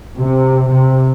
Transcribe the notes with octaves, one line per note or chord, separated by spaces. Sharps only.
C3
C3